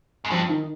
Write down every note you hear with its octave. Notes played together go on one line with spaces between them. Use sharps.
G#2
G2 F3
D#3